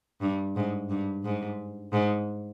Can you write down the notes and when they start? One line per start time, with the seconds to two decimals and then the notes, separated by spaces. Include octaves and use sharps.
0.21 G2
0.56 G#2
0.90 G2
1.24 G#2
1.93 G#2